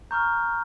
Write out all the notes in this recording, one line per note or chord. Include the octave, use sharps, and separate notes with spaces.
A#5 C#6 F6 G6